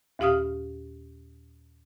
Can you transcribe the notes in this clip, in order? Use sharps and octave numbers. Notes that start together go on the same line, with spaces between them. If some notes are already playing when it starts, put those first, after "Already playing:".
D#2 A#2 G4 F5 D#6 F6